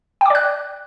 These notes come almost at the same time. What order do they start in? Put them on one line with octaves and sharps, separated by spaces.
G5 D6 D5 F#6